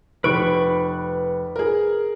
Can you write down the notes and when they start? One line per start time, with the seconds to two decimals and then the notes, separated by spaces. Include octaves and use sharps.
0.24 F1 B4 C#6 D7
1.56 G#4 A#4